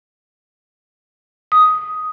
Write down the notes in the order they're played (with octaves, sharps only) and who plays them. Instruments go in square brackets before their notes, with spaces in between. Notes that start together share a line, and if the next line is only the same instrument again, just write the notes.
[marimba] D#6